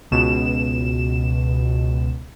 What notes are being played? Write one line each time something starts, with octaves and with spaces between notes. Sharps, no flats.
C#2 B2 E7